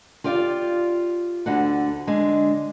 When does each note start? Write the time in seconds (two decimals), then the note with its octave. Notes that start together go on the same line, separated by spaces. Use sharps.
0.24 F4 G4 D5 E5 F5
1.46 D2 D3 F#4 F#5
2.07 D3 G#3 D4